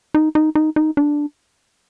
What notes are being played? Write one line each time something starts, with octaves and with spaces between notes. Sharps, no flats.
D#4
D#4
D#4
D#4
D4